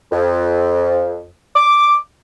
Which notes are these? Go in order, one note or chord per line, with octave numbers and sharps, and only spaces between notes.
F2
D6